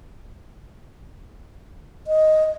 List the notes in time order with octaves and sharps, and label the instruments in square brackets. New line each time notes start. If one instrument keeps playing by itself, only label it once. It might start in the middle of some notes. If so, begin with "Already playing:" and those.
[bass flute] D#5